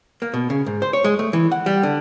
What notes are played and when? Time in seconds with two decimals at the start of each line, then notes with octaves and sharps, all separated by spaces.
0.22 A#3
0.34 B2
0.50 C#3
0.66 G#2
0.82 C5
0.93 C#5
1.04 G#3
1.19 A3
1.33 E3
1.52 F#5
1.66 G3
1.83 D3